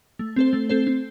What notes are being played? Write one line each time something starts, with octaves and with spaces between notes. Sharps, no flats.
A3
C4 A4 C5
A3
C4 A4 C5
C4